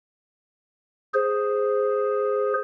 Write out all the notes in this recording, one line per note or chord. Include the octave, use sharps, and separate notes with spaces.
G#4 C5